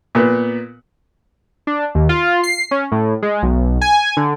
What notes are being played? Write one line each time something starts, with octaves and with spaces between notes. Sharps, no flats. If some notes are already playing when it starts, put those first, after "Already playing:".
A#2 B3
D4
D#2
F4
C7
C#4
A2
G#3
B1
G#5
D3